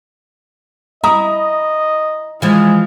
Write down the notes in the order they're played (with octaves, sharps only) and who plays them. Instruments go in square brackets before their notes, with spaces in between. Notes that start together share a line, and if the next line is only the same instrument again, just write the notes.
[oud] E4 [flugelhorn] D#5 [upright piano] A#5 D#6
[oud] E3 F3 [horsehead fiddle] G#3